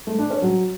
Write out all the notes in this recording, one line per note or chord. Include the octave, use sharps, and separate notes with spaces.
A3
D4
C#4
F#3